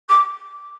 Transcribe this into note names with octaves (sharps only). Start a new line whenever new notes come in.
D6